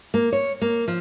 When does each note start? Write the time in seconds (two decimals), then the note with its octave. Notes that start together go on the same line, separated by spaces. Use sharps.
0.14 A#3
0.33 C#5
0.61 A#3
0.88 F3